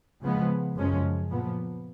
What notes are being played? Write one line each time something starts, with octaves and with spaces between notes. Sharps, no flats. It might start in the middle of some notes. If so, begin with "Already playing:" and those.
C#3 F3 G#3 B3
F#2 C#3 F3 G#3 C#4
A#2 F3 B3